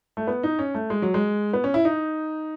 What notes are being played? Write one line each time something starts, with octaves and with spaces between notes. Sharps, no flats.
A3
B3
D#4
C#4
A3
G#3
F#3
G#3
B3
C#4
E4
D#4